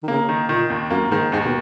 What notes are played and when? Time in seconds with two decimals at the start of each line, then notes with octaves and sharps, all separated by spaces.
0.03 D#3
0.08 C#3 A#3
0.29 D#3
0.49 A#2 D#3
0.70 D#2
0.90 F#2 A#3
1.11 G#2 D#3
1.32 D#2 G#2
1.45 B2